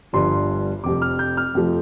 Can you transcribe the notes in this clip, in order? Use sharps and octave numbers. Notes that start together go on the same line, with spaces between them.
G1 G2 F3 C6
F1 F2 C3 D6
F6
G6
F6
F2 C3 F3 A3